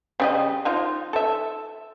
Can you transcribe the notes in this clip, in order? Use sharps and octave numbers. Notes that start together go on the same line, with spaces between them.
C#3 G3 D#5
F3 D#4 F4
A4 E5